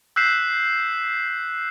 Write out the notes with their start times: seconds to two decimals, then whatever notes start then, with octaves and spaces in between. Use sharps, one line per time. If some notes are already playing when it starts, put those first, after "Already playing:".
0.16 E6 F#6 G6 B6 C7 E7